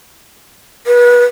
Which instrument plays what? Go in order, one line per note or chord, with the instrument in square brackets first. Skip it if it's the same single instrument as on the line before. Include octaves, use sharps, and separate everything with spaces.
[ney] B4